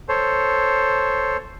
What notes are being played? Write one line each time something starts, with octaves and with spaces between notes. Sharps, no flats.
A4 C5 C#5